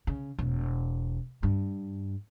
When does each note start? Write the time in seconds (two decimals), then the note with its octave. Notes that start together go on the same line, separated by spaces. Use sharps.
0.07 C#3
0.39 E1
1.43 G2